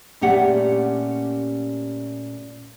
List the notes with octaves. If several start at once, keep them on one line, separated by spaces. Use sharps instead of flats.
A#2 A3 C#4 G4 F#5